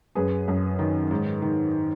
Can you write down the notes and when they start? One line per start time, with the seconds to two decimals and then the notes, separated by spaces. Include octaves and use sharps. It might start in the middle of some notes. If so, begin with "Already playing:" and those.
0.15 F#2 G#4 B4
0.48 F#2
0.79 D#3
1.11 G#2
1.42 D#3